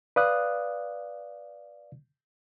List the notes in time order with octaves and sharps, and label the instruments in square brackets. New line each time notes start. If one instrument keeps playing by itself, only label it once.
[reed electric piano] B4 D5 F5 D#6 F#6